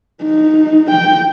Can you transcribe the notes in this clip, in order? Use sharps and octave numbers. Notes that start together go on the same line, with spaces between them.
D#4
G5